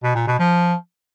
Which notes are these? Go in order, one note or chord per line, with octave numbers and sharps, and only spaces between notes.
B2
A#2
B2
F3